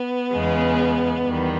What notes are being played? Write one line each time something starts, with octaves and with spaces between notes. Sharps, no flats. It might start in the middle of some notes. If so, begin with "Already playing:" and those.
Already playing: B3
E2 C#3 G#3
E2 D#3 G3